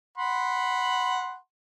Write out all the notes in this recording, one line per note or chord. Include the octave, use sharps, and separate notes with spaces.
F#5 B5 C6